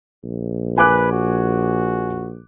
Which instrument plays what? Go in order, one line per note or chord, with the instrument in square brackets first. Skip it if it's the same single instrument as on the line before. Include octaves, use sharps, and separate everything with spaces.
[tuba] A#1
[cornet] B4 [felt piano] G#5 D6 F#6
[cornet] F#4